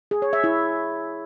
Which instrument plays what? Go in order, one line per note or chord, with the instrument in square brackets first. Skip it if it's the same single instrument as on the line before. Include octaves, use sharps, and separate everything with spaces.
[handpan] G#4
C#5
E5
E4